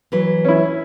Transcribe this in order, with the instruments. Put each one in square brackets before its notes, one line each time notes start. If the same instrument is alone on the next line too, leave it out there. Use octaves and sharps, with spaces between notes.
[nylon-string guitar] E3 F#3 B4
[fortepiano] C#4 E4